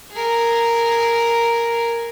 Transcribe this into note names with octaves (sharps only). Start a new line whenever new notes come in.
G#4 A#4